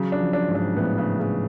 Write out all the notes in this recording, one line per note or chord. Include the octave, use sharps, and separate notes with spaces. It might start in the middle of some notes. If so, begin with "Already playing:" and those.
Already playing: C#3 F#3
D4
F3
D4
G#2
D4
A2 B3
C#3
C#3